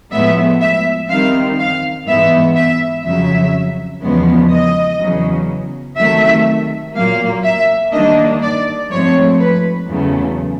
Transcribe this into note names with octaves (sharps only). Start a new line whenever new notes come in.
A2 F3 G#3 B3 E5
E5
D#3 G3 C4 F5
F5
G#2 E3 G#3 B3 E5
E5
F2 C#3 F#3 E5
E2 C#3 F3 G#3 B3
D#5
E2 C#3 F#3
C3 D#3 F#3 A3 E5
A#2 F#3 A#3 F5
E5
D#3 G3 A#3 D4 D#5
D5
G#2 F3 A3 C4 C#5
B4
E2 C#3 F#3 A3